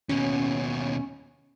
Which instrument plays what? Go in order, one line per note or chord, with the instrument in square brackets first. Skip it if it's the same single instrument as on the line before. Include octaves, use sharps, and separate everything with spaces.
[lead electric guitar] D#2 B2 [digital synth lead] C#4